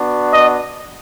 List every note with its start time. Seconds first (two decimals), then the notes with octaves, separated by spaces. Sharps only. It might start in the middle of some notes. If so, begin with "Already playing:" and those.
Already playing: B3 D4 F#4
0.32 D#5